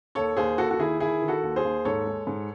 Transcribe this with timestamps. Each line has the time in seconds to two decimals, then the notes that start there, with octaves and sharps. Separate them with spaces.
0.15 D#2 A4 C#5
0.37 D#2 G#4 C5
0.58 D#2 F#4 A4
0.71 F#4
0.79 D#3 E4 G#4
1.00 D#3 E4 G#4
1.22 D#3
1.28 F#4 A4
1.43 D#2
1.56 G#4 C5
1.64 D#2
1.85 G#2 A4 C#5
2.07 G#3
2.27 G#2